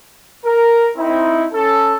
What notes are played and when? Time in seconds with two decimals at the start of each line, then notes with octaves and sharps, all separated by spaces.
0.45 A#4
0.97 C4 D#4 E4
1.53 C#4 A4